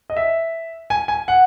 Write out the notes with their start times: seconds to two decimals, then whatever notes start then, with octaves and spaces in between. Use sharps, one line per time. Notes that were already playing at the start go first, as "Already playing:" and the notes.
0.10 D#5
0.17 E5
0.90 G#5
1.08 G#5
1.28 F#5